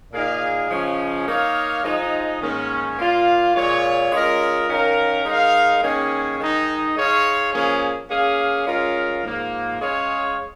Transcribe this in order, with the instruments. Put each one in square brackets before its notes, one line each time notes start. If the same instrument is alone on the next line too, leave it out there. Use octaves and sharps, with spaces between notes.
[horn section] A#2 A#3 D#4 G#4 F5
C#3 F3 G#3 C#4
A#3 D#4 A#4 C#5 F5
F3 G#3 D#4
G#2 D#3 A#3 C#4
A#2 A#3 F4
A#2 G#3 F4 C#5
G#3 C#4 F4 A#4 D#5
D#3 C#4 A#4 F5
G#3 D#4 A#4 F5
D#3 A#3 C#4 G#4 C#5
D#3 G#3 D#4
G#3 D#4 G#4 C#5 F5
C#3 F3 A#3 C#4 G#4
A#3 C#4 G#4 F5
G#3 C#4 F4 A#4 F5
G#2 F3 A#3
G#3 C#4 G#4 C#5 F5